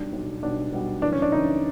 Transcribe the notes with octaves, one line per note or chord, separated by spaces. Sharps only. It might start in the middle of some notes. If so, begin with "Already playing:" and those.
Already playing: B1 B2 G3 D4
B1 B2 G3
B1 B2 G3 D4
B1 B2 G3
F#2 C#3 E3 D4
C#4
D4
F#2 C#3 E3 D#4